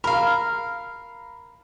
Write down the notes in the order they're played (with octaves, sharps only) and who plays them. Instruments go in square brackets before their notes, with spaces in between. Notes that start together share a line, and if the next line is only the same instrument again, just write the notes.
[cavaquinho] A#4 F5 [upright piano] B5